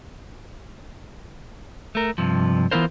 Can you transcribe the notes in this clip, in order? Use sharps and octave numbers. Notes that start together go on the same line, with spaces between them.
A3 A#4
G2 C3 F3
E3 B3 E4 F4 A#4 C5